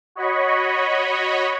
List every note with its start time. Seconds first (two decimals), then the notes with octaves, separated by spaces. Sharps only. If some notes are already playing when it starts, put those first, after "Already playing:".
0.15 F#4 C#5 D#5 B5 C#6